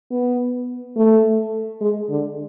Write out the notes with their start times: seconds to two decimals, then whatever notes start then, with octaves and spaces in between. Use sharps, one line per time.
0.11 B3
0.97 A3
1.81 G#3
2.10 D3